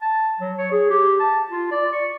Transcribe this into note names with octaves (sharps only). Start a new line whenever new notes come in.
A5
F#3
C#5
G#4
G4
A5
F4
D5
C#6